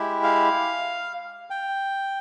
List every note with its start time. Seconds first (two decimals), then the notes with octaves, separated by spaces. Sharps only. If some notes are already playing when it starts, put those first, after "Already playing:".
Already playing: G#3 E4 G4
0.23 F5
1.50 G5